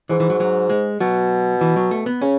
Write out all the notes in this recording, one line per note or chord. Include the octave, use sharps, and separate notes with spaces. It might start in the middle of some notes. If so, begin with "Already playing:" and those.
G#2 E3
E3
F#3
F#3
G#3
B2 F#3
E3
F#3
A3
B3
C#3 C#4